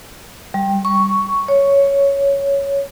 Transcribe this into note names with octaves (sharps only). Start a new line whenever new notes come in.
G3
C#6
C#5